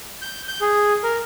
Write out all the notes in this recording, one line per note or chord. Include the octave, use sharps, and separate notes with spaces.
G6
G6
G#4
A#4